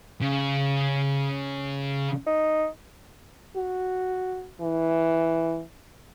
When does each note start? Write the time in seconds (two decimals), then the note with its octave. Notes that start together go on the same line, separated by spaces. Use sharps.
0.22 C#3
2.27 D#4
3.56 F#4
4.61 E3